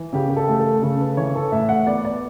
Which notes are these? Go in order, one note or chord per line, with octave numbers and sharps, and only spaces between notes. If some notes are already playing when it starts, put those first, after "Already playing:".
Already playing: E3
C#3 G4
G4
A4
A3
A4
C#3 A4
B4
E3 C#5
A4
A2 E5
F#5
B3 D5
D5